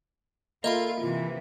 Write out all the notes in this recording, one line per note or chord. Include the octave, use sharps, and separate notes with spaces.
A#3 F4 A4 D#5 E5 B5
C3 E3 F4